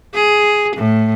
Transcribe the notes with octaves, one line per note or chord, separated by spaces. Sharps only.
G#4
A2